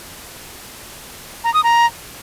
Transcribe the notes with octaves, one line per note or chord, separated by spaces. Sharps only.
A#5
D#6
A#5